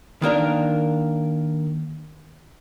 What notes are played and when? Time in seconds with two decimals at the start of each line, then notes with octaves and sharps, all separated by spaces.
0.22 D#3 A#3 D4 A#4